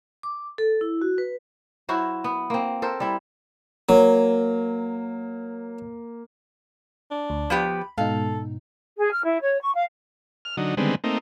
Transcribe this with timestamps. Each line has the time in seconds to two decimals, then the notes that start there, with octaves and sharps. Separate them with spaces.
0.23 D6
0.58 A4
0.81 E4
1.02 F#4
1.18 B4
1.89 F#3 E4 F#4 C5
2.24 B3
2.50 A#3 C4
2.82 A4 A#4 C5
3.00 G3 E4
3.89 F#3 A#3
7.11 D4
7.30 D2
7.50 F3 B3 G4 B5
7.98 G#2 B2 D#4 A4 F5
8.98 G#4
9.11 F6
9.23 E4
9.40 C#5
9.61 C#6
9.74 F5
10.45 F6
10.57 D3 F#3 D#4
10.77 D3 D#3 G3 G#3 B3 C4
11.04 A3 A#3 C4 D#4